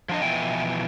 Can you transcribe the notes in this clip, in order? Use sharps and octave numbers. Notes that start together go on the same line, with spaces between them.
F3 D4 D#5
B2 E3 F3 E4 G5 G#5